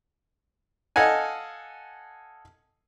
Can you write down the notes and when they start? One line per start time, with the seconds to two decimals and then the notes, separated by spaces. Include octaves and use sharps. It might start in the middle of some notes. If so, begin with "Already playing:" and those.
0.96 A4 D#5 F5 F#5 G#5